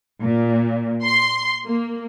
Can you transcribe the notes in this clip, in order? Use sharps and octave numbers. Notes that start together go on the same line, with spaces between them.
A#2
C6
A#3